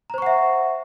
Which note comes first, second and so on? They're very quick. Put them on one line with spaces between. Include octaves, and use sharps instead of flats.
A#5 C5 C#6 F#5 E5